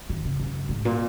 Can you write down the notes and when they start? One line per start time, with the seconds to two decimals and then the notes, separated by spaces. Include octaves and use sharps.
0.10 D#3
0.25 C#3
0.40 F#2
0.69 G#2
0.85 A#2